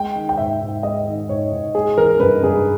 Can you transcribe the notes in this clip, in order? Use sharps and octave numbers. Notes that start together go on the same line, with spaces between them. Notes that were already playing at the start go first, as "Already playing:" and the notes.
Already playing: G#3 G5
D#3
G5
G#2 E5
G#2
G#3 D#5
D#3
G#2 C#5
G#2
G#3 G#4
E3 A#4
G2 B4
G2 G#4